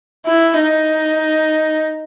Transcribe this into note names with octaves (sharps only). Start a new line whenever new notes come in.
E4
D#4